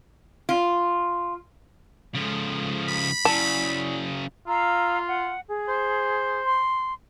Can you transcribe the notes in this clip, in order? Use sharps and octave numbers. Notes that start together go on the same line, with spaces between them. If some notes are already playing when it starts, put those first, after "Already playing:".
F4
C#3 F3 G#3 A4 D#6
B5
C#3 F#3 E4 D5 G#5 A5
F4 F5 A#5 E6
F#5
G#4
C5
C6